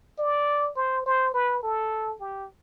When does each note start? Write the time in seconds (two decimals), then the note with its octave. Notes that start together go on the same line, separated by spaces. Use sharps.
0.18 D5
0.76 C5
1.06 C5
1.34 B4
1.63 A4
2.20 G4